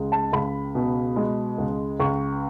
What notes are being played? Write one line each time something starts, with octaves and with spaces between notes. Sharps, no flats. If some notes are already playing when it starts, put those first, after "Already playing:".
Already playing: C#2 G#3
A5
C#2 B5
B2
G#3
C#2
C#2 C#6